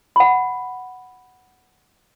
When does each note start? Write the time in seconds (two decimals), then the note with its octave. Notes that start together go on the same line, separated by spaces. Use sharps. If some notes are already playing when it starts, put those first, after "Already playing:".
0.16 F#5 B5